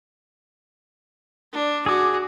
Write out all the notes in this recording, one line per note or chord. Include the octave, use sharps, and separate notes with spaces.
D4
F#4 G#4 D6